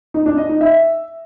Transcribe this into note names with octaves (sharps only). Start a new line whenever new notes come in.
D#4
D4
D#5
D#4
E5